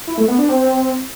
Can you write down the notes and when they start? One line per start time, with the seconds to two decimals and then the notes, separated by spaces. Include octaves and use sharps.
0.07 E4
0.18 A3
0.28 B3
0.38 D4
0.49 C4